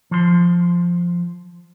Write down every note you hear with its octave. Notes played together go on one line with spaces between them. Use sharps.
F3 C6